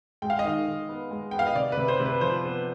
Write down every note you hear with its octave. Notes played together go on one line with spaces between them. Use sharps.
G#3 G5
F5
D#5
D#3 F5
D#3
B3
G#3
B3 G5
F5
D#5
C3 D5
B4
C3
C5
C3
B4
F3 C5
B3